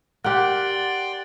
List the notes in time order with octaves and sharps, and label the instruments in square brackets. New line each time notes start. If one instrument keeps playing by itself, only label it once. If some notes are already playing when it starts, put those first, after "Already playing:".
[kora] G4 A#4 [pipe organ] D5 G5 C6 [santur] F#5